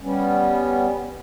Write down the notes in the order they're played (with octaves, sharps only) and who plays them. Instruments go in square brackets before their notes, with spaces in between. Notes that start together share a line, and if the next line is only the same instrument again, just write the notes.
[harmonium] G3 B3 C#4